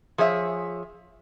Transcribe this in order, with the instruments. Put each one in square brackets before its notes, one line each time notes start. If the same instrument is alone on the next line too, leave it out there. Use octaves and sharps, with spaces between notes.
[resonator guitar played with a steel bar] F3 G#4 C#5 E5